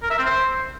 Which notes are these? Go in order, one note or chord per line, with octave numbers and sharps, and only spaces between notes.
A#4
E5
C4
C5